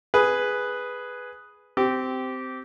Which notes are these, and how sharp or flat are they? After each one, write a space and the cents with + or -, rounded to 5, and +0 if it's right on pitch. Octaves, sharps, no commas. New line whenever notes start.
G#4 +0 B4 +0
C4 -15 G4 -15